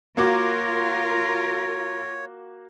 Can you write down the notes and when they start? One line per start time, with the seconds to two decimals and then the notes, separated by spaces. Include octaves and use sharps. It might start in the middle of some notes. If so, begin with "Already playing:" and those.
0.17 A#3 F4 F#4 A#4 C#5 D6